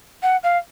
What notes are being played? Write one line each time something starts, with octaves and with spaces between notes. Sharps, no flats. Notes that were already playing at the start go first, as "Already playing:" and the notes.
F#5
F5